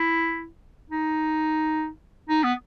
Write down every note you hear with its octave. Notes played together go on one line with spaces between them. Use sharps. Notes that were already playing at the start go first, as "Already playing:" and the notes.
Already playing: E4
D#4
D#4
B3